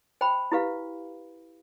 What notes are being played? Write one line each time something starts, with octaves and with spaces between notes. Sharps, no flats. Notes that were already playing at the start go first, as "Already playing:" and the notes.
C5 G5 B5
E4 G4 B4 F5